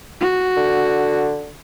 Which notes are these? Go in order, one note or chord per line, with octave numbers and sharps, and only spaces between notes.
F#4
D3